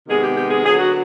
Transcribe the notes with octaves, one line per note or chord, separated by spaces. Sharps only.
C3 D#3 G#3 B3 G#4
G4
G4
G#4
D3 F#3 B3 G#4
F#4